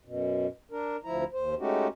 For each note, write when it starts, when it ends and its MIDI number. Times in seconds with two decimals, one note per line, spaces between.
0.05 0.47 42
0.05 0.47 47
0.71 0.97 62
0.71 0.97 70
1.04 1.24 38
1.04 1.24 53
1.04 1.24 64
1.04 1.24 82
1.33 1.55 39
1.33 1.55 72
1.59 1.88 56
1.59 1.88 57
1.59 1.88 61
1.59 1.88 63
1.59 1.88 66
1.59 1.88 67